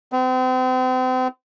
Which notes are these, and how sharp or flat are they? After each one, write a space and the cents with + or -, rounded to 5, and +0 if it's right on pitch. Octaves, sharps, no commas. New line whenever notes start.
C4 -40